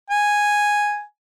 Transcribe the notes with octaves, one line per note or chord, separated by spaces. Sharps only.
G#5